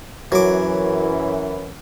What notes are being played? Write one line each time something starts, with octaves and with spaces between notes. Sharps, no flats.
F#2 E3 F#3 D6